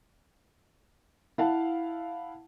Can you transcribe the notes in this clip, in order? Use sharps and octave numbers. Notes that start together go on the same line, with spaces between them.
E4 F5 F#5 A5